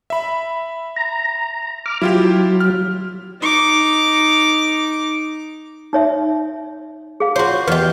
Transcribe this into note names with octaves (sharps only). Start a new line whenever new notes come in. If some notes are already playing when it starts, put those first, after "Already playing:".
E5 B5
A#5
D6 F6
F#3 E4 F4 G4
F6
D#4 D6
D#4 C#5 E5
G#4 F5
F4 F#4 C5 C#5
E2 G4 B4 D#5